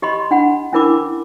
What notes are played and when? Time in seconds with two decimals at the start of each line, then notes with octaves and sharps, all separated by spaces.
0.02 G4 D#5 B5 C6
0.31 D4 F#5 B5
0.73 C#4 D4 E4 A#4 B5 D6